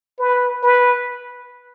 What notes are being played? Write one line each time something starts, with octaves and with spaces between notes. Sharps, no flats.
B4
B4